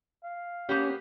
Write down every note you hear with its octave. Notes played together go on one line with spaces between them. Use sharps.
F5
A#3 B3 C#4 G4